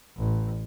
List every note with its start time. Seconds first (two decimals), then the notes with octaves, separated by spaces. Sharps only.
0.17 A1